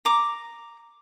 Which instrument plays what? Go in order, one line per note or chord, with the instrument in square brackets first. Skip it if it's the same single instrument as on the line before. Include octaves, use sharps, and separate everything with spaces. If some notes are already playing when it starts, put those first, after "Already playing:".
[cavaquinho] A#5 D6